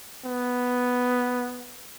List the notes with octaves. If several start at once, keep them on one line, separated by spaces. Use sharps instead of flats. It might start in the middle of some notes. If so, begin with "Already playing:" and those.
B3